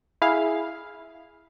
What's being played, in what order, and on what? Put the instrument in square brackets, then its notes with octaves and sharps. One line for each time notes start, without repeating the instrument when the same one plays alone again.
[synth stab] E4 G#4 F5